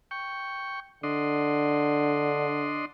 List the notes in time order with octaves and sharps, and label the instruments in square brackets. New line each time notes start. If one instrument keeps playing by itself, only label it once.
[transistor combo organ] G5 C#6
[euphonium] D3 [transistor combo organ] D4 D#5 C6